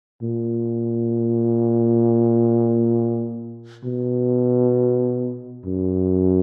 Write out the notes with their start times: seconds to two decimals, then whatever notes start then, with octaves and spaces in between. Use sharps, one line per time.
0.22 A#2
3.84 B2
5.66 F#2